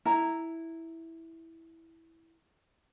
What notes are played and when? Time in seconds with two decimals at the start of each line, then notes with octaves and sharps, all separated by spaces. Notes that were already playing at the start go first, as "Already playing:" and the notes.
0.06 E4 A#5